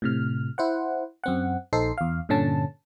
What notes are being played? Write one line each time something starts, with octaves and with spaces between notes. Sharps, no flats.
A2 C3 F6
E4 C5 F#5
F#2 C4 F#5
A#1 D#4 A4 C5 C7
E2 F5
G2 A#2 D3 C#4 A5